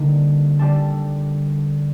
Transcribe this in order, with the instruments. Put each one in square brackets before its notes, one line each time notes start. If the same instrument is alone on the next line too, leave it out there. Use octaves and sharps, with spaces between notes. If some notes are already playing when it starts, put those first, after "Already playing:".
Already playing: [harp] D3 G3 A#3 D#4
D3 G3 D4 A4